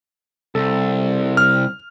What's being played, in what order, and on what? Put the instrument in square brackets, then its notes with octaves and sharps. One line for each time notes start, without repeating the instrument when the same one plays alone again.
[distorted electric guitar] C2 [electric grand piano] A4
[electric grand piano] F6